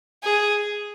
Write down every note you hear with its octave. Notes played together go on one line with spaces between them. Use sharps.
G#4